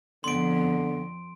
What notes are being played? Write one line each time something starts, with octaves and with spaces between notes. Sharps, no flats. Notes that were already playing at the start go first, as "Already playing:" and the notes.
F2 D3 B3 C6 D7